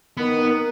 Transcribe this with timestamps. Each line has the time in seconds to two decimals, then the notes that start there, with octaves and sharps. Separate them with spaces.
0.17 D#3 B3
0.33 D#4
0.49 A#4